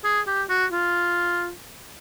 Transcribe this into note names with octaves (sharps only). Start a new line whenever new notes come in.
G#4
G4
F#4
F4